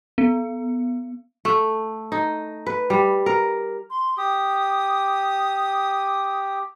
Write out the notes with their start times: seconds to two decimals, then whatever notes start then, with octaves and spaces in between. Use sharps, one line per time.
0.18 B3
1.45 A3
2.12 D#4
2.66 B4
2.90 G3
3.26 A#4
3.90 C6
4.17 G4 D#6